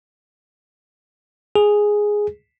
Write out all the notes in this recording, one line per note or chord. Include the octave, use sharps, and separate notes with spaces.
G#4